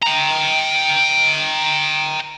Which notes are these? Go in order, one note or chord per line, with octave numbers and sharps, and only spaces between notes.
G5 A#5